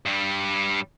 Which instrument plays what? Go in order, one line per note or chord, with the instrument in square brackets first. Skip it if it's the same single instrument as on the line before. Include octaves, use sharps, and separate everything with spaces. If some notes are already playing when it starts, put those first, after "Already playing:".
[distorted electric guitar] G2 G3